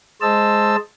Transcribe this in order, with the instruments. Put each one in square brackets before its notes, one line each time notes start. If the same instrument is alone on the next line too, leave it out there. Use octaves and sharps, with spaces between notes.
[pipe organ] G#3 C5 D#5 A5 E6